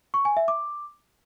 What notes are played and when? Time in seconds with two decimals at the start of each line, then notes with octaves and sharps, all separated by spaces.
0.14 C#6
0.25 G#5
0.37 E5
0.48 D6